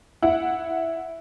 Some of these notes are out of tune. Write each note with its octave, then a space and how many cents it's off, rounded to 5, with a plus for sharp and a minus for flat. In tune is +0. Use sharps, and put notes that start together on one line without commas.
E4 +0 F#5 -10